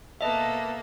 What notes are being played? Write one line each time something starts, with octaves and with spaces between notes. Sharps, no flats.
B2 A#3 A4 B4 D#5 E5 A5